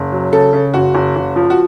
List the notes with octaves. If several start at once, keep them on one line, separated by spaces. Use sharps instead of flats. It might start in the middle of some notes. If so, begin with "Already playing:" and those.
Already playing: F#1
F#3
C#3 A4
C#3
F#1 F#4
F#1
F#1
F3
F#4